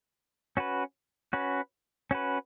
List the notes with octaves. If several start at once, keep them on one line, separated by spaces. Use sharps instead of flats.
C#4 F#4 B4
C#4 F#4 B4
C#4 F#4 B4